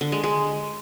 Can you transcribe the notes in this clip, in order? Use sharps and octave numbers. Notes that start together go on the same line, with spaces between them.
D3
G#3
G#3